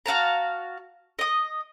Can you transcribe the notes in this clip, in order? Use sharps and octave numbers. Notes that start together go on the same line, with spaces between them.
F#4 F5 A5 A#5
D#5 D#6